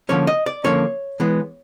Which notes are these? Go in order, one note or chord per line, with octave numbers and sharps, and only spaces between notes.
D3 F3 A#3 C#4 C#5
D#5
D5
D3 F3 A#3 C#4 C#5
E3 G#3 B3